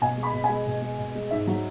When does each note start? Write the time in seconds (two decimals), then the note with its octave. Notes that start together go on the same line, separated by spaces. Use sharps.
0.01 B2 G#5
0.18 G#3
0.23 B5
0.33 B2
0.44 G#5
0.49 G#3
0.66 B2
0.82 G#3
0.98 B2
1.15 G#3
1.31 G#2 E5
1.47 F#3